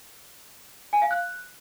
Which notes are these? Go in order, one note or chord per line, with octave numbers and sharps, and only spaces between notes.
G#5
F5
F#6